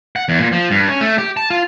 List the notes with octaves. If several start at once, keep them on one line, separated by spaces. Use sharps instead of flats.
F#5
E2
A#2
F3
G2
C#4
A3
G4
A5
F4